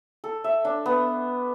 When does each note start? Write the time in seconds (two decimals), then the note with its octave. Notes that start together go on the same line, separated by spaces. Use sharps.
0.24 A4
0.44 E5
0.65 D4
0.86 B3